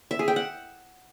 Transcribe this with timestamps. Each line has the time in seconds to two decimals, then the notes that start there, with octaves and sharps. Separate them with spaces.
0.11 E5
0.19 G#4
0.28 G5
0.36 F#5